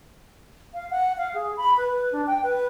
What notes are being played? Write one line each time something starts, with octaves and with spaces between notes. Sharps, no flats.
F5
F#5
F5
G#4
B5
B4
D4
G5
B4